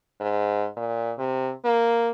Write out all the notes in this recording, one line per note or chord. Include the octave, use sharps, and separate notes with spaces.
G#2
A#2
C3
A#3